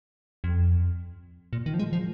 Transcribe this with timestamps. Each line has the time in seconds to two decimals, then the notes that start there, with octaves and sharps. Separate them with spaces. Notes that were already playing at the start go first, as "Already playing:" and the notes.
0.44 F2
1.53 A#2
1.66 D#3
1.74 F3
1.79 G#3
1.93 F3